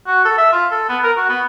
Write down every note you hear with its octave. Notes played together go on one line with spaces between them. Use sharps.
F#4
A4
E5
F4
A4
B3
A#4
F#4
B3